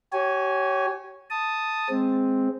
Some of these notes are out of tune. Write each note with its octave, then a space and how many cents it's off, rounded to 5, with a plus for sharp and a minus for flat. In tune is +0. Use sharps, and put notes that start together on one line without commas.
G4 -40 C#5 +0 G#5 +0
A5 +0 D#6 +0
G#3 +0 C4 +0